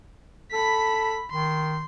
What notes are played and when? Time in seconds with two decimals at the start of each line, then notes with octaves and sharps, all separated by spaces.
0.52 A4 B5 B6
1.31 D#3 C6